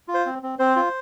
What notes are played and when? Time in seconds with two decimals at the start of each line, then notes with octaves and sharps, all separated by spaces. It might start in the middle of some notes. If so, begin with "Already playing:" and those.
0.08 F4
0.14 C5
0.26 C4
0.43 C4
0.59 C4 C5
0.76 F4